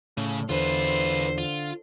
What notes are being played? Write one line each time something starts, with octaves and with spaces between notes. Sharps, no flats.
A2 C#3
E2 D3 F4 B4 C5
F4